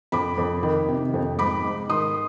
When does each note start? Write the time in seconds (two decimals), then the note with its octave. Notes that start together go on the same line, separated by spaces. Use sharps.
0.12 F2 B5 D6
0.38 F2
0.63 D#3
0.88 C3
1.14 F2
1.38 G#2 B5 D6
1.64 G#2
1.90 D#3 C6 D#6